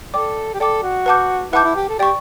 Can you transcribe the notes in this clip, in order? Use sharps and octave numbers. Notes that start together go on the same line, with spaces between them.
A4 D5 G5 D6
G4
A4 D5 G5 D6
F#4
B4 F#5 A5 D6 G6
E4 B4 F#5 A5 D6 G6
E4
G4
A4
G4 D5 G5 C#6